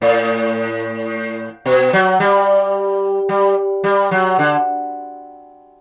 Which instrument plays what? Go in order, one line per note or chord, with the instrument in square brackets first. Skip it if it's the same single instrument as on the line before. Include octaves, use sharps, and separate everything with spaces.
[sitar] A2
B2
F#3
G3
G3
G3
F#3
D3